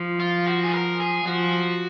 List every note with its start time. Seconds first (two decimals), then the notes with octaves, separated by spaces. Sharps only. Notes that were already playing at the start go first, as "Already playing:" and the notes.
Already playing: F3
0.20 F4
0.46 F#4
0.63 G#4
0.73 A#4
1.00 G#4
1.26 F3 F#4